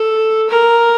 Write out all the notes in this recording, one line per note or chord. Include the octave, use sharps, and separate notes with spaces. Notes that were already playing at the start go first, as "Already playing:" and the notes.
Already playing: A4
A#4